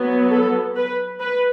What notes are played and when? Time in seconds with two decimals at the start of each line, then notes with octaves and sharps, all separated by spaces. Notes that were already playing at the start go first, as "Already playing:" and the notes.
Already playing: F#3 B3
0.31 A4
0.76 B4
1.20 B4